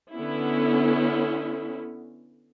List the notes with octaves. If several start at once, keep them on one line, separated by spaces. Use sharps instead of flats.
D3 B3 C#4 E4